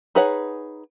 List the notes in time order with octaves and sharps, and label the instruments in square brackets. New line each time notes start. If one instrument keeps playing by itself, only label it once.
[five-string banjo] D#4 G#4 B4 C#5 F#5